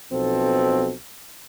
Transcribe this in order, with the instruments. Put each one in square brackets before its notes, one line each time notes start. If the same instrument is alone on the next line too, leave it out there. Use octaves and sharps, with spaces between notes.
[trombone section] B1 B2 F3 C4 A4